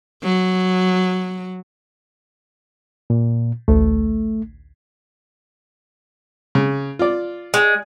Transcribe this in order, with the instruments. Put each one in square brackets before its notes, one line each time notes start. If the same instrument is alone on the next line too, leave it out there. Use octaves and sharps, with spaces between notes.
[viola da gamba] F#3
[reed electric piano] A#2
[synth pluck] A1 D2 [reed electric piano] A3
[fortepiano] C#3
F4 D5
[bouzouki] G#3